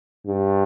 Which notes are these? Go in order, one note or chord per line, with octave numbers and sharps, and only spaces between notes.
G2